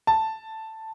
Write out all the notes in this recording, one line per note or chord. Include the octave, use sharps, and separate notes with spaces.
A5